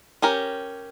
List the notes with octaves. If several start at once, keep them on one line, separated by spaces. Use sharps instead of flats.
C#4 G4 A#4